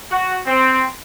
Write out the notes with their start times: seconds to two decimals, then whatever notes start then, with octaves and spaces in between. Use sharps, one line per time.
0.11 F#4
0.46 C4